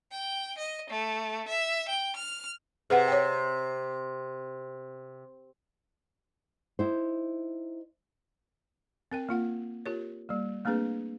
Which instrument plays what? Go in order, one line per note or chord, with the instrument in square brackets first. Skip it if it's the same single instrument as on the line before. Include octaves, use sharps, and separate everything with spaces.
[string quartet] G5
D#5
A3
E5
G5
F6
[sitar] C3 [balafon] G#4 B4 F#5
[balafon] C#5 G5
[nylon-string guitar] D#4 E4 C5
[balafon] C4 A#4 G5
A#3 F4 F#5
F4 G4 A#4 C#5
G3 A#3
A3 A#3 C4 D4 G#4 B4